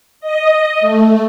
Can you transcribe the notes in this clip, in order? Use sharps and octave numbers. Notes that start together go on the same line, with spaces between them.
D#5
A3